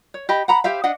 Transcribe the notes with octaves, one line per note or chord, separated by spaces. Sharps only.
C#5
G4 D#5 B5
F#5 A#5 B5
G4 C5 E5 F5
D4 D#5 F#5